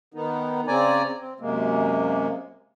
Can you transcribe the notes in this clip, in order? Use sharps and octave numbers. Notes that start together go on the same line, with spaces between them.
D#3 B3 D#4
C#3 C4 D5 G#5 A#5
C4
F#2 C3 G#3 A#3